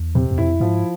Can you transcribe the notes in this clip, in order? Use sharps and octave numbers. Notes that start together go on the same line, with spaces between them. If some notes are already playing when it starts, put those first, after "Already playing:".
Already playing: E2
C3
E2
F2 E4
G#2 F3